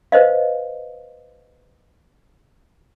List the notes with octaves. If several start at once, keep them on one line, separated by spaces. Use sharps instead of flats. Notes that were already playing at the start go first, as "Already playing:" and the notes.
B4 C5 D#5 F5